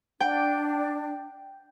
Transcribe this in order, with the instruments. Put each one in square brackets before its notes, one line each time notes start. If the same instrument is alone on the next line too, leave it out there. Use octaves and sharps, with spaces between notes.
[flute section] D4 [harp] G5